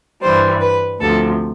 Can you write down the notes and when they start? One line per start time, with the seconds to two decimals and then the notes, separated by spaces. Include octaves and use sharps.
0.22 G2 E3 G3 C5
0.61 B4
1.00 D2 C3 F3 A4